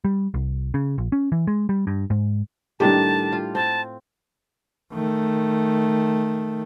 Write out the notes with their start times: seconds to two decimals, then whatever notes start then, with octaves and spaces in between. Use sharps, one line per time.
0.05 G3
0.34 C2
0.74 C#3
0.98 A#1
1.12 C#4
1.32 E3
1.47 G#3
1.69 G3
1.87 G2
2.10 G#2
2.80 A2 D#3 G3 D4 G4 A5
3.32 F4
3.55 C4 A5
4.94 D#3 A3